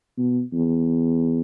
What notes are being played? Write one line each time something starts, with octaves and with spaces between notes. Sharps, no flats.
B2
E2